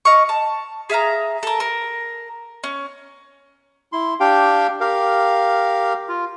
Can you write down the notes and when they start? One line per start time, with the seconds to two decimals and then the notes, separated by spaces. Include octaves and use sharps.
0.05 D#5 F5 C#6
0.29 A5
0.90 G#4 E5 F5 A#5
1.43 A4 A#4
1.60 A#4
2.64 C#4
3.92 E4 C6
4.20 D4 G4 F5 G5
4.81 G4 A#4 F5
6.09 F4